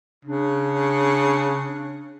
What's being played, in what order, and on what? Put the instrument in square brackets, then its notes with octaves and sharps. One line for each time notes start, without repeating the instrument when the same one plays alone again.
[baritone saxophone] C#3 [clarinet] D4